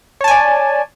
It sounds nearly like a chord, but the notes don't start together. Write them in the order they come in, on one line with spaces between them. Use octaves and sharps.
C#5 A5 G#5 D5